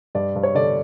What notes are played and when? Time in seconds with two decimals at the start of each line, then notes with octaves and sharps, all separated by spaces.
0.15 G2 D5
0.35 G2
0.43 C#5
0.55 D3 D5